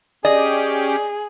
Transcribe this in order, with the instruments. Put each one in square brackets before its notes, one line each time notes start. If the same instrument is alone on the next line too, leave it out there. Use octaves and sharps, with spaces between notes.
[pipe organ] C#4 G4 [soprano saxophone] G#4 [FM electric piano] D5 [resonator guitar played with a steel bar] D#5